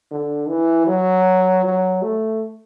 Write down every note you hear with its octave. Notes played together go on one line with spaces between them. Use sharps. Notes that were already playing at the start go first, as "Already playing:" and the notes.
D3
E3
F#3
F#3
A3